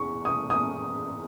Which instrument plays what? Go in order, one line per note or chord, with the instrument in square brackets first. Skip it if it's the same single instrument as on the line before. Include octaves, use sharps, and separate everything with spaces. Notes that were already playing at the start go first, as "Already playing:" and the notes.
Already playing: [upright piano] E2 C#6
D#6
D#6